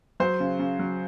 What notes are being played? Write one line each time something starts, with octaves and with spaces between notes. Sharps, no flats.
F#3 C5
C#3
C#3
F#3